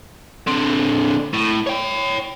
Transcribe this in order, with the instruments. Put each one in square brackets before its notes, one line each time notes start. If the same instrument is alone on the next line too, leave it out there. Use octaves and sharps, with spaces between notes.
[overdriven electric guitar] D3 C4
A2
C#5 G5